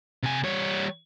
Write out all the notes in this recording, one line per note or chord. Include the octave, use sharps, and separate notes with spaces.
C3 G#5
G3 C#5